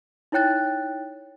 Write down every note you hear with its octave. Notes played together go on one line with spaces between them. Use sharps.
D#4 E4 C#5 G5 F#6 A6